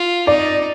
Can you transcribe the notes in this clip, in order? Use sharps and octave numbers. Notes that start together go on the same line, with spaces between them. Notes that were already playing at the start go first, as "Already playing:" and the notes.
Already playing: F4
D#4 D5